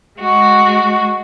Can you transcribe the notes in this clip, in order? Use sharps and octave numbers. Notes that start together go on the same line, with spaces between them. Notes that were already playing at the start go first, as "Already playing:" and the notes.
G#3 F#4